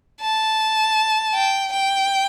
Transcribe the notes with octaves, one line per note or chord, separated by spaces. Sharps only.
A5
G5
G5